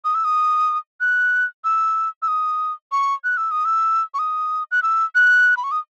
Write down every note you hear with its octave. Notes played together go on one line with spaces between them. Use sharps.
D#6
E6
D#6
F#6
E6
E6
D#6
C#6
F#6
E6
D#6
E6
C#6
D#6
F#6
E6
F#6
B5
C#6
D#6